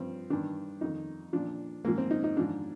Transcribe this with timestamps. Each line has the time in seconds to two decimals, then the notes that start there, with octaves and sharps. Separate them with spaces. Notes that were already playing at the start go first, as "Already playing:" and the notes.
Already playing: G2 F3 C4
0.30 G2 D#3 D4
0.81 F2 D#3 D#4
1.33 A#2 F3 D4
1.85 G#2 F3 A#3
1.98 C4
2.11 D#4
2.24 D#4
2.37 G#2 F3 D4